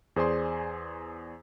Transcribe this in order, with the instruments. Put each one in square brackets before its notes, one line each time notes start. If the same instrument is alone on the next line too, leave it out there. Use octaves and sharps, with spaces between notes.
[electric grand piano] E2 G#4 C5 D5 G#5 C6